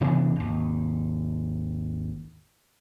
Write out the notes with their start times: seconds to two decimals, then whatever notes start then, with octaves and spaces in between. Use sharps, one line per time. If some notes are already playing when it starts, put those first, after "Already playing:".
0.01 C3 E3 B3 D4
0.36 G#1 D#2